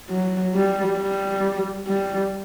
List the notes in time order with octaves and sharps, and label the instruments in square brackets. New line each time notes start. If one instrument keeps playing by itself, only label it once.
[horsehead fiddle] F#3
G3
G3
G3